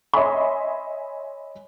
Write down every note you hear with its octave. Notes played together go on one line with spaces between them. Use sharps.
C#5 D#5 E5 G#5 B5 C6